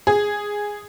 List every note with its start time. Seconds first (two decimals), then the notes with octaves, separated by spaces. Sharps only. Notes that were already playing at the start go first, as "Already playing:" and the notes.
0.07 G#4